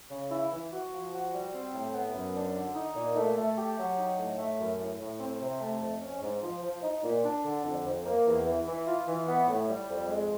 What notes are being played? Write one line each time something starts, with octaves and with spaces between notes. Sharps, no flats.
C#3
E4
E3
F#4
F3
F#4
G3
C4
A2
B3
F#2
D4
D3
D#4
A#2
A3
A3
G4
F#3
D#4
A2
A3
F#2
A2
A2
C4
C3
A3
F2
C#4
G#2
F3
F3
D#4
A#2
D4
D3
F2
F2
A#3
E2
E3
E3
F4
E3
B3
A2
G3
F2
G#3